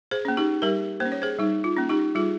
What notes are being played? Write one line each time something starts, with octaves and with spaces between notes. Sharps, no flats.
G#4 C5
A#3 C#4
D#4 G4
G3 G4 A#4
A#3 C5
C#4
C#5
G#4 C5
G3 D#4
F4
A#3 C#4
D#4 G4
G3 F4 G#4